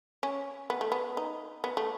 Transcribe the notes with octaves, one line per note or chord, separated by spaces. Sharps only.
C#4
B3
A3
B3
D#4
B3
A3